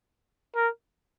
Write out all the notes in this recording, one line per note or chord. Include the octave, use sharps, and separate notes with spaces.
A#4